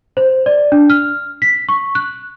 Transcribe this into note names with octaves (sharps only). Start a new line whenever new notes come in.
C5
D5
D4
F6
B6
C#6
F#6